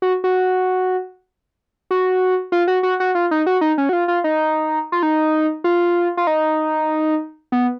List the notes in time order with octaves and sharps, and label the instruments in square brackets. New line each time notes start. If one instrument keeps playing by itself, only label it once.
[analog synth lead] F#4
F#4
F#4
F4
F#4
F#4
F#4
F4
D#4
F#4
D#4
C#4
F#4
F4
F4
D#4
F4
D#4
F4
F4
D#4
B3